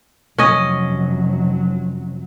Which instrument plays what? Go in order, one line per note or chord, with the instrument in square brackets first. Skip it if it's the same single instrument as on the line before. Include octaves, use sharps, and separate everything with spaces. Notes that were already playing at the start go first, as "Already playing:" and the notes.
[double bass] F1 F#3 [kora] C#4 D#5